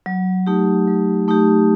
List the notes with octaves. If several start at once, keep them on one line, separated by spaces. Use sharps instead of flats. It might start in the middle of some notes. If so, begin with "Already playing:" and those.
F#3
A3 D#4 G4
F#3
A3 D#4 G4